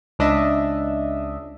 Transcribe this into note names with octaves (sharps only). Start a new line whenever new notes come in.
C#2 D4 D#5 E5